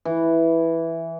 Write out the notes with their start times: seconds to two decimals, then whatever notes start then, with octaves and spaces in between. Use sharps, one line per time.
0.05 E3